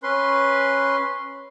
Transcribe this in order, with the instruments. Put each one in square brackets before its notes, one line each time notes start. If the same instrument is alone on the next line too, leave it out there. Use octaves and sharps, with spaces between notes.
[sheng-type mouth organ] C#4 B4 C6